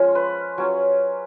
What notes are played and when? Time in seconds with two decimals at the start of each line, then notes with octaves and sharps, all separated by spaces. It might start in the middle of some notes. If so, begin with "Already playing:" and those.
Already playing: F3 G#3 C#4 F4
0.15 B4
0.58 F#3 C#4 F4